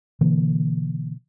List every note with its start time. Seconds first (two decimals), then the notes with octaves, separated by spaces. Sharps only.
0.21 B2 D3 E3 A#3